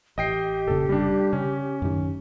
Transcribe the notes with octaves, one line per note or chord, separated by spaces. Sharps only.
A1 G4 D#5 G5 C7
F1 A#2 C#3 A4
G3 D4
C#3 C#4
F#2 A2 D#3